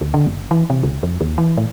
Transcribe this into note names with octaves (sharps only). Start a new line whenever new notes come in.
D2
D3
F#1
E3
C3
C#2
F2
D#2
E3
A2